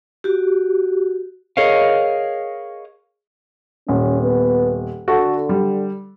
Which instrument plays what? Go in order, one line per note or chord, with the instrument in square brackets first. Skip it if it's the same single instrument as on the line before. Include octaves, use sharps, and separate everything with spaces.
[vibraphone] F#4 G4
[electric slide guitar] G#4 A#4 C#5 D#5 F5
[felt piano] D#1 [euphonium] C#4
[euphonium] B3
[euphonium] D3 [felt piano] F#4 A4
[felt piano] G3